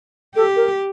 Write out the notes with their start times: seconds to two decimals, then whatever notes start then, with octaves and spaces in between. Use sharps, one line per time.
0.36 G4 A4
0.56 A#4